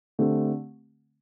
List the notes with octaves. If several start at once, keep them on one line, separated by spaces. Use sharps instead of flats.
D3 A3 C4 G4